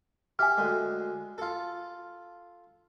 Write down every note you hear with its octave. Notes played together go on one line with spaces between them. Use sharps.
G4 E5 G#5 F6
D2 G#3
F4 A4